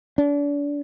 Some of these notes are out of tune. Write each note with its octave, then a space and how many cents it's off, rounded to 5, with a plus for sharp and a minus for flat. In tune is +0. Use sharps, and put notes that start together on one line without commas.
D4 -35